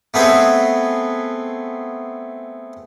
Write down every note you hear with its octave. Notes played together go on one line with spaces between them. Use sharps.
A3 B3 C4 G#4